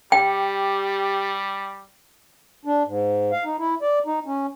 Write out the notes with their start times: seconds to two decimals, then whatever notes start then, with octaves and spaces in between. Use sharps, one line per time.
0.12 G3 G4 G5
2.65 D4
2.86 G#2
3.32 F5
3.44 D#4
3.59 E4
3.82 D5
4.06 D#4
4.26 C#4